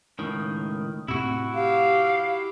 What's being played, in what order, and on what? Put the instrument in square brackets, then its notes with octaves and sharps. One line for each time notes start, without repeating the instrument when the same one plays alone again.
[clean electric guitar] C#2 A2 D#3
[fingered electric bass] A2 C3 [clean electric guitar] E4 F#4
[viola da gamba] G4 [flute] F5